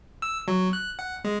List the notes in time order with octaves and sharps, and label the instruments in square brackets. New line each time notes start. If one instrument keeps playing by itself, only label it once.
[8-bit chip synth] E6
F#3
F#6
F#5
G#3